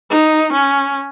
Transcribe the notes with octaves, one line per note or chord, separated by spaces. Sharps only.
D#4
C#4